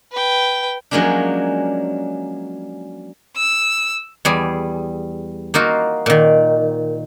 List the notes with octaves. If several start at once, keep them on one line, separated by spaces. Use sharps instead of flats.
B4 G5
F3 F#3 G#3 A#3 C#4 D4
E6
E2 G3 G#4
A#3 D#4 F4 F#4
A#2 D#3